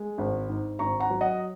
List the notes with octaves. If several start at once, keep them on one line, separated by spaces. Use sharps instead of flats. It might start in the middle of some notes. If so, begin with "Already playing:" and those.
Already playing: G#3
G#1
G#2
G#1 A#5 C#6
F#5 A#5
F#3
D#5 F#5